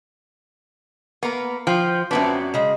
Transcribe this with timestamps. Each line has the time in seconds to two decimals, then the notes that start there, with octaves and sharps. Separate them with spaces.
1.23 A#3 B3 A#4
1.67 F3 C5 G5
2.11 F#2 F#3 B3 C4 D4
2.54 C#3 G#3